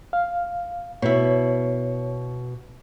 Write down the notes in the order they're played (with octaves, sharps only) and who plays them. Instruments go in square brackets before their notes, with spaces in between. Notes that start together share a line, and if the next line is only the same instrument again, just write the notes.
[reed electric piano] F5
[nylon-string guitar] B2 E4 [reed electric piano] C#5